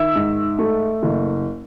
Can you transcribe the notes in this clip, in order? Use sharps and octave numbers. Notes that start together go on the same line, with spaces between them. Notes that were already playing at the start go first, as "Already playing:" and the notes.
Already playing: D#3 E5 E6
G#2
A3
F#1